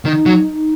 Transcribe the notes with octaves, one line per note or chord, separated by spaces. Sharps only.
D#3 D#4
F#3